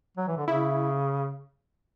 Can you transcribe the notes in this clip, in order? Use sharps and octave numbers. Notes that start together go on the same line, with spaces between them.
F#3
E3
D3
C#3 E4